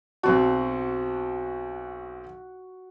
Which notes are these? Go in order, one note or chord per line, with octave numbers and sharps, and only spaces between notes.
B1 C4 F#4 A5